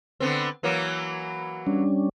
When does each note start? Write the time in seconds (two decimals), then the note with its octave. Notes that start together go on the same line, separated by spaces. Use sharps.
0.20 D3 B3 C4
0.63 E3 F#3 A#3
1.67 G3 C#4 D4